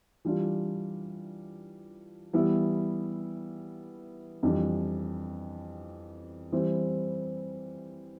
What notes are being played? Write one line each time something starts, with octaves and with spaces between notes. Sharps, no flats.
E3 G3 D4 F4
E3 G3 B3 E4
F2 E3 G3 D4
E3 G3 C4 E4